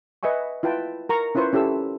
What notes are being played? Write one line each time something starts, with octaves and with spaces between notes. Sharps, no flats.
B4 D#5 E5 G#5 C#6
E4 F4 B4 G5 A5
A#4 A#5 C#6
C#4 E4 F4 B4 C5 C#6
C#4 E4 G4 A4 E6